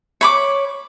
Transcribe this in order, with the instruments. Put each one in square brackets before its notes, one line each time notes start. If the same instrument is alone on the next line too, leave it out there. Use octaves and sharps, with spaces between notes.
[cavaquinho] C#5 B5 D6